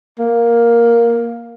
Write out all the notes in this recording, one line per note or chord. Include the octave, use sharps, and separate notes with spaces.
A#3